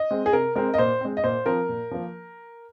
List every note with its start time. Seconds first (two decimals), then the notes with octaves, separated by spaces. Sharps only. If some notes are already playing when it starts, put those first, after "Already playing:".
Already playing: D#5
0.11 G#3 C4
0.26 G#4
0.33 C3 A#4
0.56 G#3 C4 A#4
0.74 D#5
0.78 A#2 C5
1.01 G#3 C4
1.17 D#5
1.24 A#2 C5
1.46 F3 C4 A#4
1.69 A#2
1.91 F3 A#3